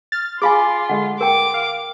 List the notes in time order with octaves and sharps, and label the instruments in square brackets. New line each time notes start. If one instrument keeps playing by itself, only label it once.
[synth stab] F6 A6
[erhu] F4 [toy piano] G#4 F5 G#5 [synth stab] B5 D6
[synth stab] D3 G#3 A3 [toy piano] F#5
[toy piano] A#4 G5 [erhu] D6
[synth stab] F5